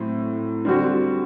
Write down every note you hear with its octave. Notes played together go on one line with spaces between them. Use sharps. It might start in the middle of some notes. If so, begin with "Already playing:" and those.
Already playing: A2 F#3 C4
D3 G3 C4 F#4